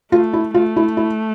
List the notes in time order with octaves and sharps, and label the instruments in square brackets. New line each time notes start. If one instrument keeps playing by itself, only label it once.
[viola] A3 [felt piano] F4
[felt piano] E4
[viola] A3 [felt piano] F4
[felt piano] E4
E4